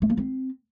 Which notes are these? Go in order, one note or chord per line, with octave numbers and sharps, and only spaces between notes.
A3
A#3
C4